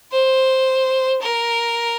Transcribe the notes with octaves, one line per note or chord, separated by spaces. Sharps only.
C5
A#4